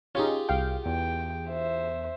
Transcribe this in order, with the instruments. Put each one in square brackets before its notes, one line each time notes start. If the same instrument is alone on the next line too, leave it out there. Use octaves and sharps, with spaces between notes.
[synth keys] C#4 D#4 [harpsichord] F4 G4 G#4
[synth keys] C2 F5 G5
[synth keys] E2 [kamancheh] G5
[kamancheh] C5 E5